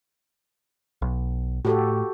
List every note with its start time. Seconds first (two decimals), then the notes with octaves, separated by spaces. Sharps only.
1.02 B1
1.65 A2 F#4 G4 A4